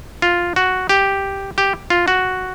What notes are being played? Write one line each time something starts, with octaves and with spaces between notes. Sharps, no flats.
F4
F#4
G4
G4
F4
F#4